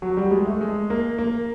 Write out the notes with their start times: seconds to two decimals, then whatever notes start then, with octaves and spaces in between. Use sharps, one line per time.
0.02 F#3
0.17 G3
0.31 G#3
0.46 A3
0.61 G#3
0.90 A#3
1.18 A#3